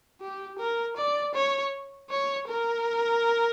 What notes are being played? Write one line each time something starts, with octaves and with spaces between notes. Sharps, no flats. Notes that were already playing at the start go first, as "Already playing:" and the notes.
G4
A#4
D5
C#5
C#5
A#4